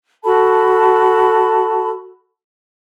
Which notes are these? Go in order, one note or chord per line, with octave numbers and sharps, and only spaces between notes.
F#4 A4 A5 B5